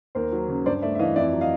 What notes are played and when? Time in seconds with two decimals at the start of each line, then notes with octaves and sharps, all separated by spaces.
0.15 D#2 A#4 C5
0.32 F#3
0.48 C#3
0.66 G2 C5 D5
0.82 A3 D5 E5
0.95 E5
0.99 E3 D#5 F5
1.16 F2 D5 E5
1.32 F#3
1.41 D#5 F5